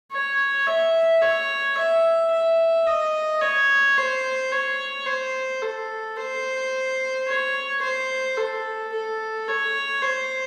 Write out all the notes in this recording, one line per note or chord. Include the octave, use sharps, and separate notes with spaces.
C#5
E5
C#5
E5
E5
D#5
C#5
C5
C#5
C5
A4
C5
C#5
C5
A4
A4
C#5
C5